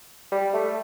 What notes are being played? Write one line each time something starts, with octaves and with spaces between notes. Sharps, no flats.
G3
A3